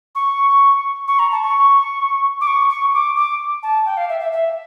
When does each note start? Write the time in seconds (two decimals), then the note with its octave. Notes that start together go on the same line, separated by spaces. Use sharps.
0.15 C#6
1.08 C#6
1.19 A#5
1.31 A5
1.43 C#6
2.41 D6
2.47 C#6
2.70 C#6
2.94 D6
3.16 D6
3.63 A5
3.86 G5
3.97 F5
4.09 E5
4.20 E5
4.32 E5